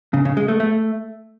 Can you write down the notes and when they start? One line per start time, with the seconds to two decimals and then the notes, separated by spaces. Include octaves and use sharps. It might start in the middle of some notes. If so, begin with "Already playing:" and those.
0.14 C#3
0.25 C#3
0.37 G#3
0.48 A3
0.60 A3